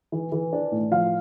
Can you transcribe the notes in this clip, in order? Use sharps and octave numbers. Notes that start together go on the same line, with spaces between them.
E3
E3
D4
A2
F3 F5